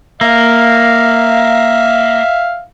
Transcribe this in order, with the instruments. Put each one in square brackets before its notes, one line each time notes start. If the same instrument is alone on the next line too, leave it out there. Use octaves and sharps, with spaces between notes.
[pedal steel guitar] A#3 [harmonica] E5 F5